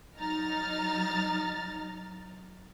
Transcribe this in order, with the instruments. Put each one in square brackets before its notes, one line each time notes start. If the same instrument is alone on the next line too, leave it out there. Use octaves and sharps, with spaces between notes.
[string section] F#3 D#4 A#5 F6 A6